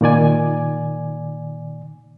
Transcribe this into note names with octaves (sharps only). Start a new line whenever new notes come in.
A#2 D#3 D5 G#5